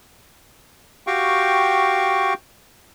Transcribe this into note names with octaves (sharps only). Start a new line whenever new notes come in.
F#4 G4 F5 G5 C#6